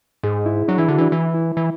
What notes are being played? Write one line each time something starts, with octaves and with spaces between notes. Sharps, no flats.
G#2 G#4
E4
F#3 D4
E3 E4
D3 F#4
E3 D4
E3
E4
E3